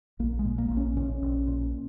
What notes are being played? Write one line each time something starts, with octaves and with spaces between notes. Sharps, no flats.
A#1 A#3
G#3
A#2
A#3
A#1 A#3
C#4
A#2 C#4
A#1
A#2